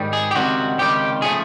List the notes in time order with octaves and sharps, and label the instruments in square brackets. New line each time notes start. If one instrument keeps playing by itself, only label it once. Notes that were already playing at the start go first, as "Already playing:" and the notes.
Already playing: [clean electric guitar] G#2 D#3 G3
G#4
G4
C#2 C3 D#3 G3 F#4
C#2 C3 D#3 G3 G4
C#3 F3 A3 G#4